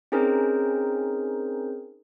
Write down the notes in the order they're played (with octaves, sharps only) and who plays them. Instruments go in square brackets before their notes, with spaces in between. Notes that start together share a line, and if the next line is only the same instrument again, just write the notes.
[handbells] C4 C#4 D#4 G#4 A#4 C5